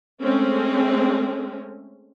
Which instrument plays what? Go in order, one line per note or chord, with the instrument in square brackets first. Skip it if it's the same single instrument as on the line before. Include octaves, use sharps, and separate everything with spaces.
[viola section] G#3 A3 C4 C#4